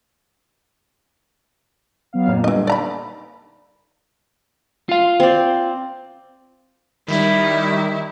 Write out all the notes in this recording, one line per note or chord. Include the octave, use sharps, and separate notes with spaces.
F#3 B3 F5
F2 A#2
D3 E3 G3 D#5
D#4 D5 A#5 B5
F4 F5
C4 D5
D#3 G3 D#4 E4